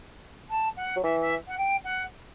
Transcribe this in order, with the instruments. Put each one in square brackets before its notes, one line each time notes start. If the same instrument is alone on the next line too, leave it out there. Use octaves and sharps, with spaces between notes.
[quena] A5
F#5
[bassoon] F#3
[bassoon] E3 [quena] E5
[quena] E5
F#5
G5
F#5